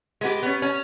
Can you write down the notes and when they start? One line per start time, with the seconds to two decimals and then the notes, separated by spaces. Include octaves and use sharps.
0.21 G#3 B3 G4
0.43 B3 C#4
0.62 C#4